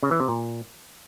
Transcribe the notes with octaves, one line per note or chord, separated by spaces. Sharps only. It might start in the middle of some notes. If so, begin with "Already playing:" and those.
C#3
E3
C3
A#2